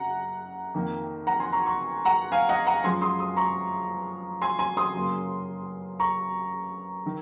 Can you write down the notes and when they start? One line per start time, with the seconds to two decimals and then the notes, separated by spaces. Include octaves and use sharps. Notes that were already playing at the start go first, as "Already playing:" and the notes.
Already playing: F#1 F#5 A#5
0.74 F2 D#3 A#3
1.27 F#5 A#5
1.40 G#5 C6
1.52 A#5 C#6
1.66 A#5 C#6
2.05 F#5 A#5
2.32 F5 G#5
2.49 D#5 F#5
2.67 F#5 A#5
2.84 F#2 F3 G#3 G#5 C6
3.02 C6 D#6
3.19 C6 D#6
3.36 A#5 C#6
4.42 G#5 C6
4.59 G#5 C6
4.77 C6 D#6
4.94 F#2 C#3 F#3 A#3
6.00 A#5 C#6
7.06 D#3